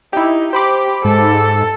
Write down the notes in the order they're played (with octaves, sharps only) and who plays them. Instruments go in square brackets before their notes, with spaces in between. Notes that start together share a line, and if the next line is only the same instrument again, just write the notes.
[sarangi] D#4 [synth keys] E4 G4
[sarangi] G4 [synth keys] C5 B5 D6
[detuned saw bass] G#2 [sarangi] A4